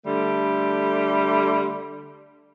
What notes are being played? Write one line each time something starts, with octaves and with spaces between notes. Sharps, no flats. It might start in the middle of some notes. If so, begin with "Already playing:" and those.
D3 G3 A3